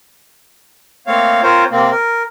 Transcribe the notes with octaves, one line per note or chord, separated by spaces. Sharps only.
A3 A#3 C4 C#5 F5
C4 F4 A#4 C5 C#5
C3 A#3 C4
A#4